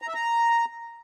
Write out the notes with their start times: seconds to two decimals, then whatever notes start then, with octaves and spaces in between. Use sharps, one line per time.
0.02 A#5
0.08 E5
0.14 A#5